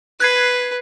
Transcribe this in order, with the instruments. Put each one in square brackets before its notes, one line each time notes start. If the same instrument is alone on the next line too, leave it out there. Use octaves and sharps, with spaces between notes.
[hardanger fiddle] B4 [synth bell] F#6 G#6 C7